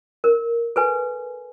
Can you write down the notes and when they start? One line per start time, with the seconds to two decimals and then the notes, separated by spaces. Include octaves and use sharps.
0.24 A#4
0.76 A4 B4 G#5